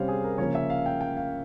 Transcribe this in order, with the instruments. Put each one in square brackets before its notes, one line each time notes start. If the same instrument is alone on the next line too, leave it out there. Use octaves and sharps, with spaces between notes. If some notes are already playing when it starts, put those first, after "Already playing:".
Already playing: [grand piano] C3 G3 C#4 C5 C#5 F5
G#4
A#4
C#3 F3 A#3 C#4 C#5
E5
F5
G5
G5
F5